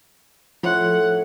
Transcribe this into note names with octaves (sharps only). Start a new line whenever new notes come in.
A2 F3 C#4 F#5 C6